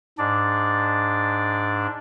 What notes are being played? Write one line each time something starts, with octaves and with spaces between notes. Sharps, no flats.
G#2 D4 D5